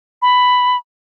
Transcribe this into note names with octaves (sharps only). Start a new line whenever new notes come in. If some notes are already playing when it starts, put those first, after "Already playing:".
B5